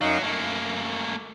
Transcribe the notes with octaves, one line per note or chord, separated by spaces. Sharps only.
F#2 F#3 D#4 F5
F#2 A3 A#3